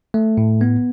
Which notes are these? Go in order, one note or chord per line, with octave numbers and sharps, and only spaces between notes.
A3
A2
B3